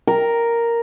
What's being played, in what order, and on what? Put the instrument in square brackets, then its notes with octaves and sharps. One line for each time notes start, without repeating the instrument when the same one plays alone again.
[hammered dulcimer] A#4